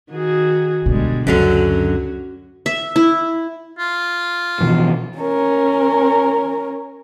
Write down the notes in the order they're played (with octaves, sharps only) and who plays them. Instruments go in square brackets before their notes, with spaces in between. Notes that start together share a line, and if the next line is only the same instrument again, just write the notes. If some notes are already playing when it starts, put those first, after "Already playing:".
[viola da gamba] D#3 F#4 G#4
[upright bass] G#2 B2 [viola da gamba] D3 G3 G#3
[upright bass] C#2 [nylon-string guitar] F#2 D3 F#3 [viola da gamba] C#4 F#4
[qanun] E5
E4
[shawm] F4
[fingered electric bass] B2 E3 F3
[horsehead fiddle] C#4 A#4